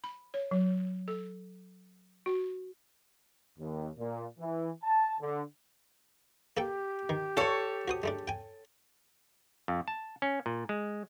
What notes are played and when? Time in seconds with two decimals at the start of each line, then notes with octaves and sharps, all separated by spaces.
0.04 B5
0.34 C#5
0.51 F#3
1.08 A4
2.26 F#4
3.59 D#2
3.98 A#2
4.39 E3
4.83 A5
5.21 D3
6.57 A#3 G4 A4 G5
7.09 D#3
7.37 F4 A4 C5 C#5
7.88 F#4 C5 D#6
8.03 G#3 A3 D4
8.28 G5 G#5
9.68 F2
9.88 A5
10.22 C#4
10.46 A#2
10.69 G#3